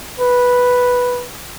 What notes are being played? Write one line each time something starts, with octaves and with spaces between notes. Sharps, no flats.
B4